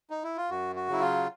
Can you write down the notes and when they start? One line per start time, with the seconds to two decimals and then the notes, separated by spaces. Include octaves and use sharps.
0.10 D#4
0.24 E4
0.37 F4
0.50 F#2 F#4
0.76 F#4
0.88 C#3 F#3 E4
1.01 F4